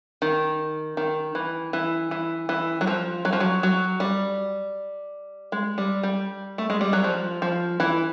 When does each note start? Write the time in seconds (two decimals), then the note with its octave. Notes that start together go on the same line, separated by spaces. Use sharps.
0.22 D#3
0.97 D#3
1.35 E3
1.73 E3
2.11 E3
2.49 E3
2.81 F#3
2.87 F3
3.25 F#3
3.33 F3
3.40 F#3
3.63 F#3
4.00 G3
5.52 G#3
5.78 G3
6.03 G3
6.58 A3
6.70 G#3
6.81 G3
6.93 F#3
7.04 F3
7.42 F3
7.80 E3